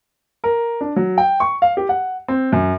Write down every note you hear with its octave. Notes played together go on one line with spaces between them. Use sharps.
A#4
D4
F#3
G5
C#6
F5
G4
F#5
C4
F#2